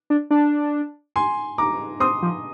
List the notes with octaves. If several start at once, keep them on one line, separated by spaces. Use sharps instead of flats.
D4
D4
G#5 C6
A#5 D6
C4 C6 D#6
F3